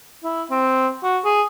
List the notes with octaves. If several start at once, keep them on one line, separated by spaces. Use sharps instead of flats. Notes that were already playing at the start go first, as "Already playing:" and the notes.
E4
C4
F#4
G#4